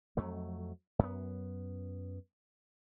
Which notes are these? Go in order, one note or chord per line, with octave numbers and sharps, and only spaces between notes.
F2 F#3 A3
F#2 B3